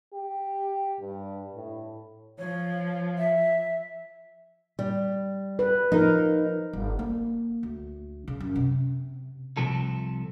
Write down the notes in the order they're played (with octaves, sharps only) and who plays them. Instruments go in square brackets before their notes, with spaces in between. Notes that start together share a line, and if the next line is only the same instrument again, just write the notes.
[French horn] G4
G2
A2
[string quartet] F3 [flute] C#5
[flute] E5
[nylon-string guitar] G3
[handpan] B4
[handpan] F3 A#4 [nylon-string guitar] D#4
[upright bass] G1
A#3
D2
C#3
F#2
C3
[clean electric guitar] C2 C3 F3 A4